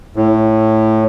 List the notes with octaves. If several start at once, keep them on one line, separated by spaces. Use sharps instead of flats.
A2